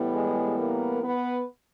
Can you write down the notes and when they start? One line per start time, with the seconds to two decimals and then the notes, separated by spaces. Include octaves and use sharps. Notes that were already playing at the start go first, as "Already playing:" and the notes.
Already playing: A2 E3 G3 B3
0.14 G#3 G#4
0.59 A#3 A#4
1.04 B3 B4